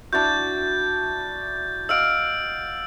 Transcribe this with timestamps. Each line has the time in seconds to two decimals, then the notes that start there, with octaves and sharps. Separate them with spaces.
0.13 D4 E4 F#4 G6 A6
1.89 D#5 F5 F#5 E6 D7